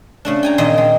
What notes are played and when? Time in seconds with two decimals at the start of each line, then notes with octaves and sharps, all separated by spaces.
0.25 C#3 A3 D4
0.43 G5 G#5 A#5
0.58 A#2 D#3 A#3 C4 D#5
0.78 G#3